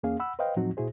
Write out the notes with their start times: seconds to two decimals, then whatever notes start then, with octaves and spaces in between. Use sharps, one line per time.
0.03 E2 A#3 C#4 G#4 F5
0.20 F#5 B5 E6
0.39 B4 C5 D#5 F5 G5
0.56 A2 F3 F#3 C4 D#4 F#4
0.77 A#2 E4 F#4 G#4 C5